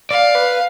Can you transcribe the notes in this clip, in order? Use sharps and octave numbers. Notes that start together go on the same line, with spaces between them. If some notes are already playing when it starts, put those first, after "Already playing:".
D5 F5
B4